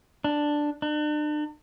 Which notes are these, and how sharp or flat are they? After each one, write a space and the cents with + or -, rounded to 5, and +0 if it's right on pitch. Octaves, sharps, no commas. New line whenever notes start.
D4 +5
D4 +40